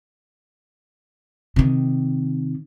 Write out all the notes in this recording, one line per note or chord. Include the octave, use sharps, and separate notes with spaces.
C3 D#3